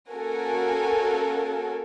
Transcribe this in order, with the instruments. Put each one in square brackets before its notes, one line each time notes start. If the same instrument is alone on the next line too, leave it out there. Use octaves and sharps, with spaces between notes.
[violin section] A#3 C#4 F#4 A4 A#4 G#5